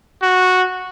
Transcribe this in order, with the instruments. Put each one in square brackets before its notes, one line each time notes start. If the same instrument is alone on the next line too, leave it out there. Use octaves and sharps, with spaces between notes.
[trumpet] F#4